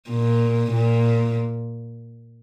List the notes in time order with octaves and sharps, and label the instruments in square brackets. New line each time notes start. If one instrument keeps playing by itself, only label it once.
[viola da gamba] A#2
A#2